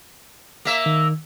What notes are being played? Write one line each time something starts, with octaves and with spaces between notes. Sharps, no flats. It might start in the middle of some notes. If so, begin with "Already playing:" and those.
A#3 E5
D#3